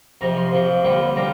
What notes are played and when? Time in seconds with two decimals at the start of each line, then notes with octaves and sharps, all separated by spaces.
0.21 F2 C3 F3 A#5
0.37 C6
0.53 F2 C3 F3
0.85 D#2 D3 G3 C4 F4
1.16 D3 G3 C4 F4 A#5